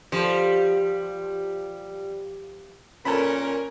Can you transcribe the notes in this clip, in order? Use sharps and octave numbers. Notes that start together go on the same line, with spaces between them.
F3 G3
A#2 C#4 A4 A#4 A5 B5